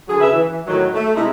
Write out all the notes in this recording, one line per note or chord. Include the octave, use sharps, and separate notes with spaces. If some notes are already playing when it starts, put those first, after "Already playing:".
D3 F#3 G#4
C#3 G#4 B4 E5
E3
A2 D#3 F#3
A3
C3 G#3 D#4 E4